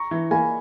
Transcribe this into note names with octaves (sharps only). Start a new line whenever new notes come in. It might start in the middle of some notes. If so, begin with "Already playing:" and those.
Already playing: A#5 C#6
E3
A#3 G#5 B5